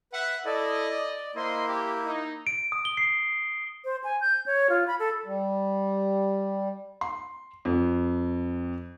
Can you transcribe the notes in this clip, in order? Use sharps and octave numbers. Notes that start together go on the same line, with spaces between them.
B4 E5 F#5
E4 A4 D5 D#5
D5
A#3 E4 C5 D#5 C6
G4
D#4
D7
D#6
G7
C7
C5
G#5
G6
C#5
F4
B5
A4
G3
C6
F2